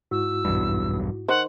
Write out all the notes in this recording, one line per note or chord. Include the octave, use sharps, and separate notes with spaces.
G#2 E4 F#4 E6
B1 E2 G2
D#3 C5 F#5